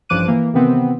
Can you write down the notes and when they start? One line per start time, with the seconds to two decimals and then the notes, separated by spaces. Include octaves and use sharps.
0.09 A1 G2 F3 D6 F#6 D#7
0.28 E3 A#3
0.53 C3 D#3 E3 B3 C4